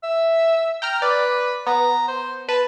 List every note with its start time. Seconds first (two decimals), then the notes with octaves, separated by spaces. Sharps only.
0.03 E5
0.82 G5 A#5 F6
1.02 B4 D5
1.67 B3 A#5
2.08 C5
2.49 B4 A5